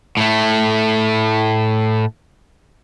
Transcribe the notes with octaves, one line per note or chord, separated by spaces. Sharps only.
A2 A3